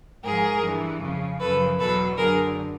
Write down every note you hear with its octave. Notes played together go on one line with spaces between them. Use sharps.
G#2 F3 G#4 A#4
G2 E3
F2 C#3 F3
F#2 C#3 F3 A4 B4
E2 B2 F#3 A4 B4
F#2 D3 F#3 G#4 A#4